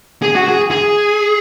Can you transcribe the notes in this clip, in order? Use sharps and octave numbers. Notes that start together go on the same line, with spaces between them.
G#4
F#4
G#4
G#4